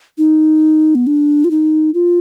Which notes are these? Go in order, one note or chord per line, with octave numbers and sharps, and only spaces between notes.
D#4
B3
D4
F4
D#4
F4